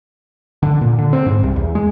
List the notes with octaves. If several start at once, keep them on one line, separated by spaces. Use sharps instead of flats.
D3
A#2
D3
C4
G#2
C2
E2
G#3